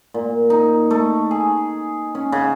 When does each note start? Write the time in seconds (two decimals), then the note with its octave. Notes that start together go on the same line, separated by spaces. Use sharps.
0.14 A#2
0.50 D#4
0.91 A3
1.31 G#4
2.15 C#4
2.32 C#3